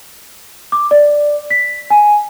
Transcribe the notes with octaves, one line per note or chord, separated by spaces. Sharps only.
D6
D5
B6
G#5